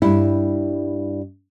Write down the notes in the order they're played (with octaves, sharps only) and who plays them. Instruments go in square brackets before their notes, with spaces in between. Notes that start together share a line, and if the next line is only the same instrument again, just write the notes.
[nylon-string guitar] G2 G3 E4